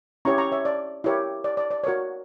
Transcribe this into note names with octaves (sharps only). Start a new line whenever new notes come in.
C#4 E4 G4 C#5 A#5 C#6
A#5 C#6
C#5 E5
D5
E4 G4 A#4 C#5
D5
D5
D5
F#4 A#4 C#5